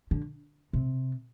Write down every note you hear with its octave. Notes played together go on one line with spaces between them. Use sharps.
D3
C3